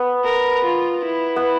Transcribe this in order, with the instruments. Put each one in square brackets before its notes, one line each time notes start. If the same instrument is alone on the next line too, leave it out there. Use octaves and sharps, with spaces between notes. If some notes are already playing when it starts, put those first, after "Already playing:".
Already playing: [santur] B3
[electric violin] A#4
F4
E4
[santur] B3